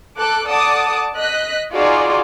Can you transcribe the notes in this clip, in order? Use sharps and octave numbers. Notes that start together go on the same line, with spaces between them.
A4 D6 F#6
A4 D5 F#5 A5 D6 D#6
D#5 F#6 B6
D#4 F4 F#4 G#4 D5